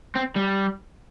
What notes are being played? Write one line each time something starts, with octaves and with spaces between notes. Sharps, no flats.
C4
G3